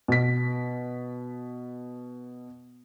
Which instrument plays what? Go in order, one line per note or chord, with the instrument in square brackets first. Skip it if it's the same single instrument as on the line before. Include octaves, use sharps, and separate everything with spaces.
[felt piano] B2 B6